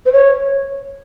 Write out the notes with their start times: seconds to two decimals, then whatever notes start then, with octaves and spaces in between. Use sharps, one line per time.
0.06 C5
0.13 C#5